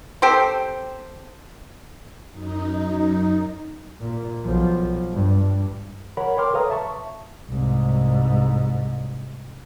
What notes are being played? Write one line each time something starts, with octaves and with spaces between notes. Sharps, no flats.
C4 G4 A4 C5
F#2 D#4
A#2
B1 F3
G2
A#4 C#5 F#5 B5
A#4 C#5 G5 C6 D6 F6
A4 B4 C#5 F5 A#5 D#6
E5 A5 C#6
C2 G#2